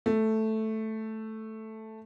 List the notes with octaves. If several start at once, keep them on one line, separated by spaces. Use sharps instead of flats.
A3